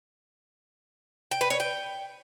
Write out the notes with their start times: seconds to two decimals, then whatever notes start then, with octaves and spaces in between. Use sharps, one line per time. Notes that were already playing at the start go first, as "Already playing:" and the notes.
1.31 G5
1.41 B4
1.50 C#5
1.60 G5